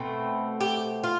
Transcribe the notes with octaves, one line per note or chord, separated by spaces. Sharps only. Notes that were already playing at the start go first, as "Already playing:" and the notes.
Already playing: B2 A3 C4
G4
F4